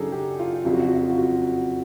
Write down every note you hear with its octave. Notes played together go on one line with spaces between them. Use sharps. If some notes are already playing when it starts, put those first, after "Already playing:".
Already playing: F#2 C#3 F#3 D4 D#4 G#4 A4
G4
F4
F2 C#3 F#3 F4
F#4
F4
F#4
F4
F#4
F4
F#4